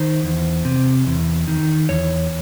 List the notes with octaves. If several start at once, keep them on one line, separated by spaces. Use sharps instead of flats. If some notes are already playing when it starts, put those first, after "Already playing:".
Already playing: D#3 C5
E2
C3
E2
D#3
E2 C#5